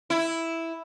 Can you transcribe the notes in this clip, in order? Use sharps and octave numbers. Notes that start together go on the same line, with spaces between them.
E4